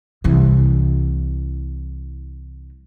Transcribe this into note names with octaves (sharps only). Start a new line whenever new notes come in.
C2 E3